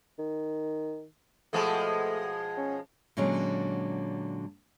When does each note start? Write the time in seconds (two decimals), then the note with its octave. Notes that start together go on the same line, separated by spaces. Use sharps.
0.19 D#3
1.53 B2 F3 G#3 A3
2.57 C#4
3.17 A#2 D3 F#3 G#3 C#4